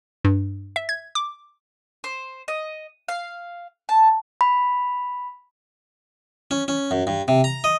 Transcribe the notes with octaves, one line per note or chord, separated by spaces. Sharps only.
G2
E5
G#6
D6
C5
D#5
F5
A5
B5
C#4
C#4
F#2
G2
C3
A#5
D#5